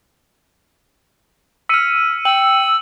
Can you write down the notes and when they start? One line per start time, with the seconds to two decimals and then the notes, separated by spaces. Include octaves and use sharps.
1.69 E6 F6 B6 C#7 D#7
2.25 G5 E6 F#7